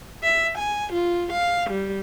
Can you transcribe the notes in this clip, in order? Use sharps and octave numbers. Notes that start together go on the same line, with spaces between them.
E5
G#5
F4
F5
G3